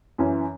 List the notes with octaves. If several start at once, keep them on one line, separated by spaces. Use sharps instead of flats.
F#2 E3 C#4